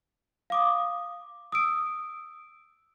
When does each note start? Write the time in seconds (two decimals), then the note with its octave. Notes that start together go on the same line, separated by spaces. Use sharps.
0.50 F5 D6 D#6
1.52 D#6 E6 D7